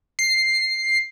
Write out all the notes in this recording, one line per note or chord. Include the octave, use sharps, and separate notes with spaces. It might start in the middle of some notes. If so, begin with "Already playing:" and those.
C7